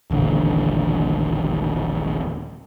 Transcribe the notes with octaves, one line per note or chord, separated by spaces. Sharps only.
D#1 A1 D3